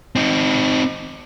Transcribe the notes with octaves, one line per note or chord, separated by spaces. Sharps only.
C4 D#4